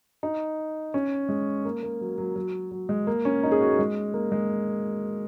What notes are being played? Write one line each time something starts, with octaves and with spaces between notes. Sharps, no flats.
D#4
C#4
G#3
A#3
A#3
F#3
F#3
F#3
F#3
G#3
A#3
C#4
D#4
G#4
F#4
A#3
G#3
A#3
G#3